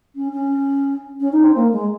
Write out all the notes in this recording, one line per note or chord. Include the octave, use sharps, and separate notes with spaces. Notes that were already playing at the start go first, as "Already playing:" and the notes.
C#4
C#4
C#4
D#4
C4
A#3
G#3